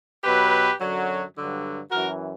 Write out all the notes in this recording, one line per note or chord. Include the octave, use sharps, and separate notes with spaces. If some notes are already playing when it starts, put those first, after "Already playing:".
B2 F#3 G4 B4
F#2 D3 F#3
G2 D3 F#3
F#2 E3 F#4 A#4